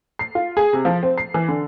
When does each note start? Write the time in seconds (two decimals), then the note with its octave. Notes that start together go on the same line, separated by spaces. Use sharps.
0.19 C7
0.35 F4
0.57 G#4
0.73 C3
0.85 F3
1.03 C4
1.18 C7
1.34 E3
1.48 D3